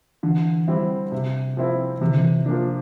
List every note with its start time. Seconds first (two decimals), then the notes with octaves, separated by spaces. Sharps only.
0.23 D3 E3
0.68 G3 C4 E4
1.12 C3
1.57 F3 C4 E4
2.01 C3 E3
2.10 D3
2.20 E3
2.46 F3 A#3 D4